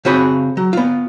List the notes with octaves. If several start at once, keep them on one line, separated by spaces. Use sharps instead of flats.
C#3 C4 F#4 G#4 B5
F#3
B3 F4